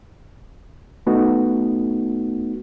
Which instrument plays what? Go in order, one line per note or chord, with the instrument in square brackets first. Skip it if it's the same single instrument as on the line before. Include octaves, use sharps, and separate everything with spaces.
[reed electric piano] A3 B3 D#4 F#4